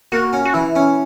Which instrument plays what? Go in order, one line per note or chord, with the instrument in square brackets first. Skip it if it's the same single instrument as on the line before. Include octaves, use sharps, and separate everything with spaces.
[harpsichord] A#3 [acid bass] F#4
[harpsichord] C#4
[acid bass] F#4
[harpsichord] E3 [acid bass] E4
[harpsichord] C#4